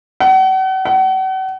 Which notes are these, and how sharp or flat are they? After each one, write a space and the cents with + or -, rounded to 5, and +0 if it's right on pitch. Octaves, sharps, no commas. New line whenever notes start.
F#5 +40
F#5 +40